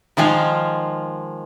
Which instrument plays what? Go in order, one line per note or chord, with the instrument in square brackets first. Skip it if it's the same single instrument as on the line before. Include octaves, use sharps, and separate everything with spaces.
[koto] D#3 F3 G#3 F4